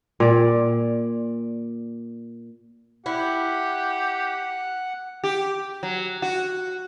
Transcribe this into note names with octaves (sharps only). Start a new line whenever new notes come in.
A#2 D5
E4 G4 F#5
G4
F#3
F#4